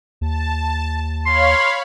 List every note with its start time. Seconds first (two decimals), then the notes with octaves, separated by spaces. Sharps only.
0.21 D#2 A5
1.26 C#5 F5 B5 C6